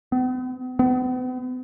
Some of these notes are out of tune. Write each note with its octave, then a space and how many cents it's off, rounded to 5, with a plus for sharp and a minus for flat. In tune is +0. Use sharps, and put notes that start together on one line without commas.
B3 +45
B3 +40